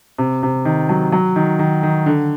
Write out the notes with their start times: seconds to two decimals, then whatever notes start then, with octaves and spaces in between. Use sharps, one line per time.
0.18 C3
0.43 C3
0.65 D#3
0.89 F#3
1.12 F#3
1.36 D#3
1.59 D#3
1.83 D#3
2.06 D3